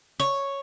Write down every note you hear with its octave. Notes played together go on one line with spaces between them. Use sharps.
C#5